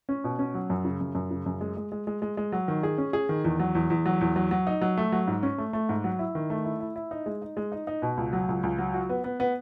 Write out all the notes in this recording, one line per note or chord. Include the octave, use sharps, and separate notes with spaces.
C#4
B2
C#4
F#3
F#2
C#3
F#2
F#2
C#3
F#2
G#3
G#3
G#3
G#3
G#3
G#3
F#3
D#3
G#4
C#4
G#4
D#3
E2
F#3
E2
E2
F#3
E2
F#3
F#3
D#4
F#3
A3
F#3
G#2
C#4
A3
A3
G#2
F#3
E4
D#3
A3
E4
E4
E4
D#4
G#3
D#4
G#3
D#4
D#4
B2
C#2
F#3
C#2
C#2
F#3
F#4
B3
B3
B3